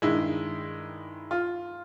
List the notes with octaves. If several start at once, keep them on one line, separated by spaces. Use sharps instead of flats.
G2 D#3 G#3 E4
F4